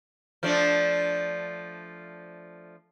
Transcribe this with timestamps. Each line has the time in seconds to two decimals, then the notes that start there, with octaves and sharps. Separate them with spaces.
0.43 F3 A3 D4